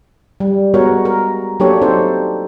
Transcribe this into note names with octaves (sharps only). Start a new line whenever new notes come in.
G3
G#3 B3 F#4 A#4 C#5
A#4
F#3 A#3 D4 G4 A4 C#5
C4 D#4 A4 C5